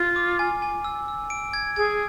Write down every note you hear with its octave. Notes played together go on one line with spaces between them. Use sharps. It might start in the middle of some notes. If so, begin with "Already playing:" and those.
Already playing: F4
D6
G#5
G#5
E6
E6
D7
G#6
G#4 G#6